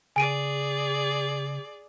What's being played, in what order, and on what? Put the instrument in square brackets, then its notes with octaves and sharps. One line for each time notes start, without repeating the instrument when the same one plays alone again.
[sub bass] C#3 [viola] G#4 D5 [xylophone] G#5 D7 D#7